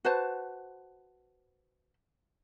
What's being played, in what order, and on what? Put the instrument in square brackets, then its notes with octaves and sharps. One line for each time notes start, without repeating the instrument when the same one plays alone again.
[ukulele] F#4 B4 C5 A5